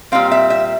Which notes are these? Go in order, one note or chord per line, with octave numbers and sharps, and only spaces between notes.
A#2 G3 C4 F5
E5
E5